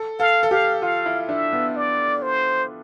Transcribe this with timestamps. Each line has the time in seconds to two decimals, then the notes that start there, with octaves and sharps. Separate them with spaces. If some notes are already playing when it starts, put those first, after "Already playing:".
Already playing: A4
0.19 A4 F5
0.43 A4
0.51 G4 F5
0.82 F4 F5
1.06 E4
1.28 D4 E5
1.53 B3
1.76 D5
2.22 C5